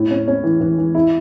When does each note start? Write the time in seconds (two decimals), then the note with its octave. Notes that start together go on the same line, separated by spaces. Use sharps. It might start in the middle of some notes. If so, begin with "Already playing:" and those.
Already playing: A2
0.11 C#4
0.28 C#4
0.44 E3
0.61 E3
0.78 E3
0.95 E4